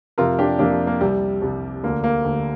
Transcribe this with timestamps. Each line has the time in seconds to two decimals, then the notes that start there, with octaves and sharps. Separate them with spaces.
0.18 F2 C3 F4 A#4
0.39 D4 G4
0.59 F2 C3 A#3 D4
0.87 A#3
1.01 C2 C3 G3
1.42 C2 C3
1.83 D2 D3 A#3
2.04 A#3
2.25 D2 D3